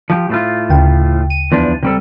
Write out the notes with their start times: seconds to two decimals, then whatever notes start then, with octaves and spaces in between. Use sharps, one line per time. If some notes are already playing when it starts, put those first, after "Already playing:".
0.10 F3 G4
0.30 A2 A3 F4
0.69 D2 C#3 G5
1.30 D#7
1.52 E2 F3 D4
1.83 C3 G3 A4